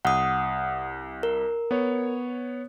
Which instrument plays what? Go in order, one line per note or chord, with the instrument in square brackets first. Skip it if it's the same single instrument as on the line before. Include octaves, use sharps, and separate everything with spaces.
[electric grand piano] C2 [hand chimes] F#5 D#6
[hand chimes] A#4
[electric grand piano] B3 C#5